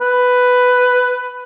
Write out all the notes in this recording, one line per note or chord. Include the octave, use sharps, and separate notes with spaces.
B4